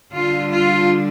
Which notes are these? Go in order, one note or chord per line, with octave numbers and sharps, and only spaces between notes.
D3 G3 D4 F4
F4